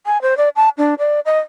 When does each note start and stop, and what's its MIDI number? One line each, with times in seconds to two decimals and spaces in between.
0.06 0.21 80
0.22 0.37 72
0.37 0.49 74
0.56 0.69 81
0.78 0.94 62
0.99 1.20 74
1.26 1.39 75